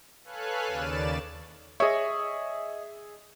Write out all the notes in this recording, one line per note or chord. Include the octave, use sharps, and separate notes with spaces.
A4 B4 C#5 F5 G#5 F#6
D#2 C#3 D5 A6 E7
G#4 C#5 D#5 E5